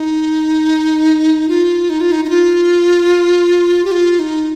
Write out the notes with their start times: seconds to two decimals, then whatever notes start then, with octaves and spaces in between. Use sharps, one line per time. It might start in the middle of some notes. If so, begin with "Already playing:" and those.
Already playing: D#4
1.48 F4
1.89 D#4
2.00 F4
2.12 D#4
2.25 D#4
2.30 F4
3.85 G4
3.91 F4
4.19 D#4